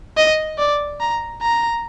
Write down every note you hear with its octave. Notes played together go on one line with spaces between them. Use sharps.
D#5
D5
A#5
A#5